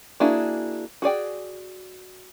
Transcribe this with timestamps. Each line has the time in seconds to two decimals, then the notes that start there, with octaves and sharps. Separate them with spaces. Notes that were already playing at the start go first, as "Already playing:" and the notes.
0.20 A#3 D4 E4 F#4 G#4
1.02 F#4 G#4 D5 G5